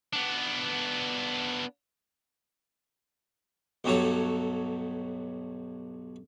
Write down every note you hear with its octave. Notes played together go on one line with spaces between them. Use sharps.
B3 D4
B1 G2 B2 F#3 A4 C#5